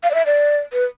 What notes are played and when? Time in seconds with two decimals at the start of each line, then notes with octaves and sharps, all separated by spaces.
0.03 F5
0.11 D5
0.14 E5
0.26 D5
0.73 B4